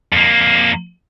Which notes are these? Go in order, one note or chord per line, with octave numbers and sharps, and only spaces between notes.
F2 A#3